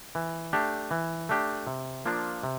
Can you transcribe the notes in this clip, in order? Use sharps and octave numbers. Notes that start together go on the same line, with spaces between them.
E3
A3 D4 G4
E3
A3 D4 G4
C3
F3 A#3 D4 F4
C3